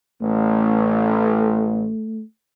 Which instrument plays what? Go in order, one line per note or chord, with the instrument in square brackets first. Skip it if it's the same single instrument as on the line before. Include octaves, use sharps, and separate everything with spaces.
[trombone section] A1 [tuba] A3